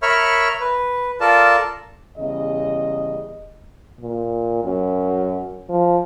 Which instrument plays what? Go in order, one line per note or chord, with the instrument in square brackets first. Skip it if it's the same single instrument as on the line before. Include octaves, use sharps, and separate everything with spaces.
[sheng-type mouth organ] A#4 C#5 E5 B5 C#6 F6
B4
F4 A4 A#4 D5 A5
[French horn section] E2 C#3 G3 D#5
[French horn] A#2
F#2
F3